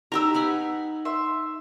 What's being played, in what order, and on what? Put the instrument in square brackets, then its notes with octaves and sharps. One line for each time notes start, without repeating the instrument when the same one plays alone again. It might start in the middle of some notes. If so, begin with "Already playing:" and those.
[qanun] D#4 G4 A#4 [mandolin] A#5 E6
[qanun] B4 F#5 G#5
[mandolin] E5 C6